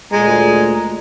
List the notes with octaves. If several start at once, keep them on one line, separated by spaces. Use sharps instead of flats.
D2 A#2 G#3 A#5